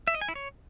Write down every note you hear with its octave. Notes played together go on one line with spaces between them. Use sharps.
E5
D#5
G#5
E4
C#5